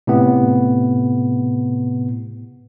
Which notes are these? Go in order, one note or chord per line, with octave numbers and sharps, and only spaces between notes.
A2 C3 B3